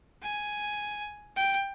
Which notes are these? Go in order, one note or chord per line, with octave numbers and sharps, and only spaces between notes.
G#5
G5